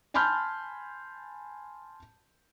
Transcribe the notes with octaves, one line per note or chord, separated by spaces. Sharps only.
G#5 A5 B5 C6 F6 G6